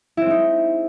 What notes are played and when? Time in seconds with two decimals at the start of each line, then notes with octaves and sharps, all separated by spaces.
0.17 E4
0.22 C4
0.26 G#3
0.30 D#4